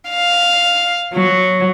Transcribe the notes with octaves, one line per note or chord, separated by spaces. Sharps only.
F5
F#3